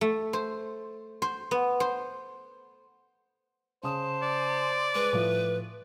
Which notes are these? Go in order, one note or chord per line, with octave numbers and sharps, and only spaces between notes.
A3
C5
C5
B3
C5
C#3 C5 A5 D#6
D5
G#3 B4
A2 F3